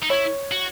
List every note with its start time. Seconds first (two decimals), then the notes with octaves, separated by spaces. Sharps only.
0.03 D#4
0.10 E4 C#5
0.52 F#4